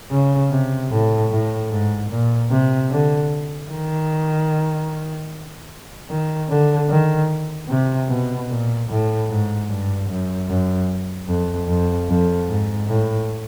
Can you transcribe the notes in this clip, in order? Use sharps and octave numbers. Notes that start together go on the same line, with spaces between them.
C#3
C3
A2
A2
G#2
A#2
C3
D3
D#3
D#3
D3
D#3
C3
B2
A#2
A2
G#2
G2
F#2
F#2
F2
F2
F2
G#2
A2